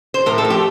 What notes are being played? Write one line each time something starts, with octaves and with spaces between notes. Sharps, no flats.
C5
A2 A#4
A4
F3 A3
G4